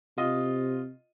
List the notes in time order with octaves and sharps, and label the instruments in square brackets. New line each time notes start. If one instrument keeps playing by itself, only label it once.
[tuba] C3 [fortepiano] F4 D#5